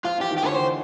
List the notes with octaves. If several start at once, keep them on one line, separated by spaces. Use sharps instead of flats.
F3 F4
E3 G4
D#3
G4
D3 E3 C#5
C5